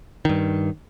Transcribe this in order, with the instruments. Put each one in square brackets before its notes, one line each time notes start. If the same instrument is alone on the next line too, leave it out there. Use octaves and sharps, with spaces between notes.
[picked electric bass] G2 D#3